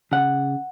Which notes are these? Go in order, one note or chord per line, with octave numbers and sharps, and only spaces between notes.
C#3 F#5